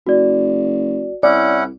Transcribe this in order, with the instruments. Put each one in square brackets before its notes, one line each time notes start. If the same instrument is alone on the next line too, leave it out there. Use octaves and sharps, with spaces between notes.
[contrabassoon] F#1 [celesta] F#4 D5
[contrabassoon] C2 [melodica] C#4 E4 F#5 [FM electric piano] D5